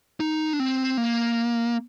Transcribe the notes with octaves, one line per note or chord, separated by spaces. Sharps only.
D#4
D4
C4
A#3